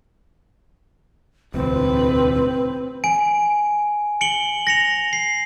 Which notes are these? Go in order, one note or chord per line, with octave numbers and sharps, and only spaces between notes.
E1 D2 A2 C4 B4
G#5 D7
C#7 D7 F#7 G7
A#6 C#7 F7
C7